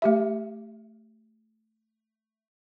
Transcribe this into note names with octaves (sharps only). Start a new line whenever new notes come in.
A3 G4 E5